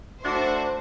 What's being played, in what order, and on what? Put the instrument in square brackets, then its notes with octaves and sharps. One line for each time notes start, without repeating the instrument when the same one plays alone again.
[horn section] A3 E4 F#4 [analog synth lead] D4 [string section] C5